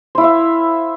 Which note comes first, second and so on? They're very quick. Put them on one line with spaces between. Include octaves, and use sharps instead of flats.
C5 E4 F5 E5